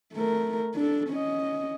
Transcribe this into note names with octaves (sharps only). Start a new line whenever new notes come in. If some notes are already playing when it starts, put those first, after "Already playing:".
A3 A#4
D4 A4
C#4 D#5